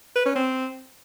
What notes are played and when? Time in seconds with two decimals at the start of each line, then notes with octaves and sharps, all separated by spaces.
0.16 B4
0.25 C#4
0.35 C4